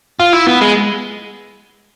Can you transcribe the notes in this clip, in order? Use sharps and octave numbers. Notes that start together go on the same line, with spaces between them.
F4
E4
B3
G#3